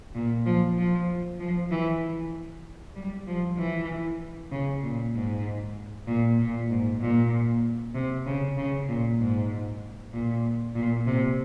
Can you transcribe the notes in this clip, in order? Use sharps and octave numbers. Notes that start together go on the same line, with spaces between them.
A#2
F3
F3
F3
E3
G3
F3
E3
C#3
A#2
G#2
A#2
A#2
G#2
A#2
C3
C#3
C#3
A#2
G#2
A#2
A#2
C3